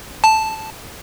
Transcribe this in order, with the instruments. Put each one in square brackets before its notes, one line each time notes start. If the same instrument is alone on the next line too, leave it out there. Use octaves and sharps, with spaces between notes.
[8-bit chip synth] A5